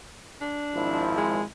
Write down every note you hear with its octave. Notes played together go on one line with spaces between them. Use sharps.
D4
G#1 F3 E4
G#3